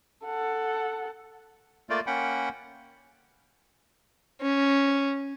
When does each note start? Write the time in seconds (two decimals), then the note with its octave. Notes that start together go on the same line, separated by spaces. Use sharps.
0.25 A4 F#5
1.90 A3 A#3 F4 D5
2.07 A#3 C#4 F#5 G5 B5
4.41 C#4